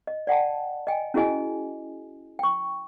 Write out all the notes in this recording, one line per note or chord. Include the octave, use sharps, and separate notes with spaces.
D#5
D5 F#5 G5 A5
D#5 G5 G#5
C#4 E4 F#4 G#4 D#5 G#5
G5 C#6